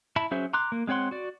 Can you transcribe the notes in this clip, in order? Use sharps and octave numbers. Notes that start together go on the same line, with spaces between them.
E4 E5 A5 B5
F#3 C#4 G#4 C5 E5
A#5 C6 D6 F#6
A#3
G#3 C4 C#5 F#5 C6
F#4 D5